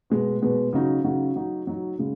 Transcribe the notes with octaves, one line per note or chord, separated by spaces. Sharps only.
B2 G#3 B3
B2 G#3 B3
C#3 F#3 D#4 F#4
C#3 F#3 D#4 F#4
F#3 D#4 F#4
F#3 D#4 F#4
C#3 G#3